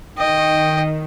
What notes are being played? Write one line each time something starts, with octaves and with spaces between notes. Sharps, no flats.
D#3 D#5 G5